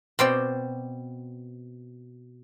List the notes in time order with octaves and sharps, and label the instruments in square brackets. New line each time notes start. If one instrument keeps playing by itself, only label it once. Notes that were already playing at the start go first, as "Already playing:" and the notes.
[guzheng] B2 C4 D5 G5